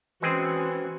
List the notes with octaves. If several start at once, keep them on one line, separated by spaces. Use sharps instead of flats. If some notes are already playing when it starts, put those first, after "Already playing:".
E3 G#3 C4 C#4 F#4 G#4